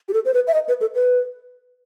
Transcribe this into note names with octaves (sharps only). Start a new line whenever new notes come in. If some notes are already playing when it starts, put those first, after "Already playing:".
G4
A4
C5
B4
E5
D#5
B4
A4
B4